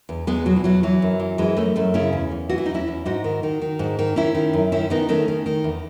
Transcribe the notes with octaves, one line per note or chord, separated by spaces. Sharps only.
E2
E2 G#3 B3
B2 F#3
E3
E2 F#3
E3 F#3
F#2
E3
F#2 E3 G#3
F#2 A3 C#4
F#2 A3 C#4
C#3 C#4 E4
E2
E2
E3 F#4
E4
D#4
E2
C#4 E4
E2
G#2 D#4 F#4
D#3
D#3
D#3
G#2
D#3
D#3 C#4 E4
D#3
F#2
D#3 C#4 E4
D#3 B3 D#4
D#3 A3 C#4
D#3
D#3
E2